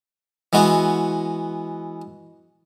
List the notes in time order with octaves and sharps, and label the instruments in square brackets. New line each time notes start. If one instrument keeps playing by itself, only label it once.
[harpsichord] E3 G#3 B3 F#4